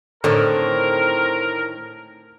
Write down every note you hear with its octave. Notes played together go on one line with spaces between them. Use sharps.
A2 D3 D#3 C4 A#4